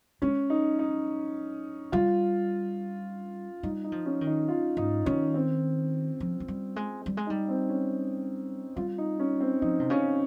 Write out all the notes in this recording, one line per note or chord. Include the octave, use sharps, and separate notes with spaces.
G#3 C#4
D#4
D#4
G3 F4
G3 D#4
D#4
F3
C#4
D#3
D#4
F4
G#2 D#4
D#3 C#4
C4
F3
G#3
G3
G#3
G3
G#3
D#4
G3
C4
C#4
G3 F4
D#4
C#4
C4
F3 D#4
C3
C#3 C#4